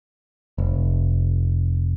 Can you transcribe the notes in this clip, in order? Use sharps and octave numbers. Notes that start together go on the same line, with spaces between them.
F1